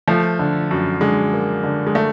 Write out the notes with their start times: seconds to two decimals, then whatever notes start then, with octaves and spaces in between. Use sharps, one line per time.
0.08 F3 A3
0.39 D3
0.71 F#2
1.01 D3 G#3
1.33 A#3
1.64 D3
1.87 G#3
1.95 A3